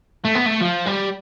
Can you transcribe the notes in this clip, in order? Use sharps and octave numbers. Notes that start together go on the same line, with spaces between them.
A3
B3
A3
F3
G3